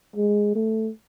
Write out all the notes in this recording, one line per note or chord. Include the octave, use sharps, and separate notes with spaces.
G#3
A3